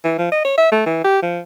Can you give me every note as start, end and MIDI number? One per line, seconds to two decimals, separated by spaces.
0.04 0.16 52
0.18 0.29 53
0.32 0.41 75
0.44 0.54 73
0.58 0.70 76
0.72 0.83 57
0.86 1.04 52
1.04 1.21 67
1.23 1.40 53